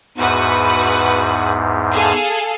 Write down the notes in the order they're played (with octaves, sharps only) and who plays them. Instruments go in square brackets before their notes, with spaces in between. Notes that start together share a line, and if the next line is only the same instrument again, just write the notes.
[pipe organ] E2 G#2 [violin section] F#4 B4 F#5
[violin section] G#4 A4 F5